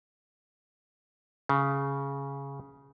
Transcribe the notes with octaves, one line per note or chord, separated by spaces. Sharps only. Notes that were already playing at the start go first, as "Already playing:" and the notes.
C#3